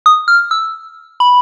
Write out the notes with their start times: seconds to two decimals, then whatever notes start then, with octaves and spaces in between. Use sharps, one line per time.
0.06 D#6
0.28 F6
0.51 E6
1.20 B5